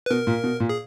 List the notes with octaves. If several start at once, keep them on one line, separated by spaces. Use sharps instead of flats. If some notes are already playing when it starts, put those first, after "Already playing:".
B4
B2 A#4
A#2
B2
A#2
G#4